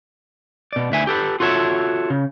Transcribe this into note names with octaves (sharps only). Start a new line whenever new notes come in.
B2 D5
D2 E5 G#5
G4 A4 B4
F4 F#4 A4 C#5 E5
C#3